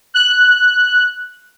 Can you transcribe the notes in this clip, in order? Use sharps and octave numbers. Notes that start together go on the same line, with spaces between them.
F#6